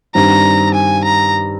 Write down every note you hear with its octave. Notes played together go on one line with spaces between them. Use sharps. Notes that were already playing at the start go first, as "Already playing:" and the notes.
G2 D#3 G3 C4 A#5
G#5
A#5